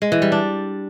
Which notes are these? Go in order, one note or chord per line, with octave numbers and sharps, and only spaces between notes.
G#3
E3
G3
D4